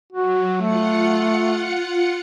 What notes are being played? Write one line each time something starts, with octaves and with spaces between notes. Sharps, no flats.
F#3 F#4
A3 F4 F#5 C#7